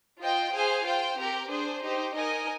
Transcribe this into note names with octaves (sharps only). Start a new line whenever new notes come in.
F4 C5 D#5 G5
G#4 C5 F5 G#5
F4 C5 G5
C4 G4 A#4
D4 G#4 C5
D#4 G4 C5
D#4 A#4 D#5 G#5